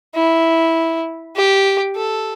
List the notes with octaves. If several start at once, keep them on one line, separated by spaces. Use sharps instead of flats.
E4
G4
A4